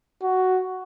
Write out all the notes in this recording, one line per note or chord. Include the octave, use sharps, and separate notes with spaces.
F#4